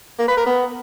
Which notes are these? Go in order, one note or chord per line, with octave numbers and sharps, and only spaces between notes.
A#3
B4
A#4
B3